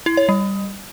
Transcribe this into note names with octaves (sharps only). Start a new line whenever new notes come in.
E4
C#5
G3